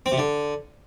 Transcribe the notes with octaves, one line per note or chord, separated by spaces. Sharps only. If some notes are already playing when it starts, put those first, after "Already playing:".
C4
C3
D3